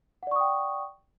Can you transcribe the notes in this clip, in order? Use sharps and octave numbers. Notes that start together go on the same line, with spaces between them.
D5 F#5 G5 C#6 D#6